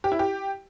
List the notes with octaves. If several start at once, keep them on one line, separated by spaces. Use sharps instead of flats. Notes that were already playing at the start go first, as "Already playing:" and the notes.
G4
E4
G4